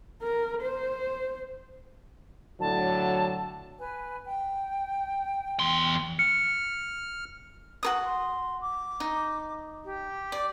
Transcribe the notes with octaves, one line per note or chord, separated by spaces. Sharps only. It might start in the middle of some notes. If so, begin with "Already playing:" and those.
A#4
C5
A2 D3 F#3 A5
B4 G#5
G5
E2 C6
F6 C#7
F#4 A#4 D#6
C6
D6
D#4
G4
D5